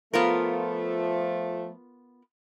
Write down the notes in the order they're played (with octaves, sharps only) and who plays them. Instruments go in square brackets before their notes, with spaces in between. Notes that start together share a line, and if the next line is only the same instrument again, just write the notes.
[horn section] F3 A3 [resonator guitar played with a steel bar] B3 F4 A#4